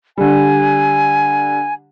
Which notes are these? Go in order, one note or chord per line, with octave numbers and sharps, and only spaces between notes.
D3 G3 G#5